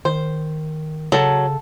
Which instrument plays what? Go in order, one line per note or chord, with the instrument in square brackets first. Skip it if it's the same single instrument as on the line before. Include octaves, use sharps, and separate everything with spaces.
[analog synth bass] D#3 [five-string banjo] C5
[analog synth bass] C#3 [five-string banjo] F#3 [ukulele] A4 A5